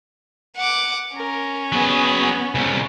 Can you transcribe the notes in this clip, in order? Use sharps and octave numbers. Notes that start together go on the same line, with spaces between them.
F#5 D6
C#4 A#4
F#3 B3 G#4
C2 C#3